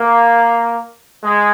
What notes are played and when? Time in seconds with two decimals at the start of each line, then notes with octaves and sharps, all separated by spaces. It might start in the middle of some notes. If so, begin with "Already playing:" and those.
Already playing: A#3
1.24 G#3